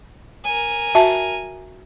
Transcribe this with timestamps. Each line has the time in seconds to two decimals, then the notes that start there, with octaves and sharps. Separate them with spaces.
0.45 A#4 G#5
0.95 F#4 E5 A5